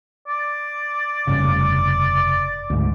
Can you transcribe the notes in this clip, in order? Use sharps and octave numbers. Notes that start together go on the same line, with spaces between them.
D5
F1 G2 C#3
D2 G#2